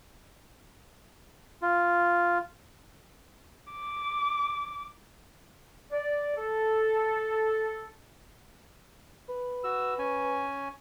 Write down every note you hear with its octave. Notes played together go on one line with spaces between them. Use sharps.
F4
D6
D5
A4
B4
F#4 E6
C#4 G#5